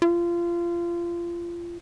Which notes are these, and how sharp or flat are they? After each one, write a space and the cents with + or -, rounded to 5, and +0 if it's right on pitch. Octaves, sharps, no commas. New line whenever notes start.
F4 -25